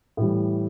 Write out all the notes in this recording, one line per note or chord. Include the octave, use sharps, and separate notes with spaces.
A2 E3 G3